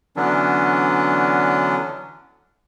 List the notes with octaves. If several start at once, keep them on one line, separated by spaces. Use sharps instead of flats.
D3 E3 F#3 B3 C#4 D4